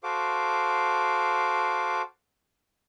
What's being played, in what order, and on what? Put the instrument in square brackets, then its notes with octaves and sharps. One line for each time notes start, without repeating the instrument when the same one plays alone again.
[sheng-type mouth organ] F#4 A4 C5 F5 D6